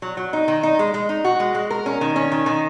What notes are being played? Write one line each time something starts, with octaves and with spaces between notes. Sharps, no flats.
F#3
F#3
D#4
D#3
D#4
G#3
G#3
D#4
F#4
G#3
G#3
A#4
C#4
D#3
C#4
D#3
D#3